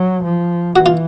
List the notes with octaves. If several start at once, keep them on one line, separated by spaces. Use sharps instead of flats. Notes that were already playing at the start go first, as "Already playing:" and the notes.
Already playing: F#3
F3
E3 F#4
F4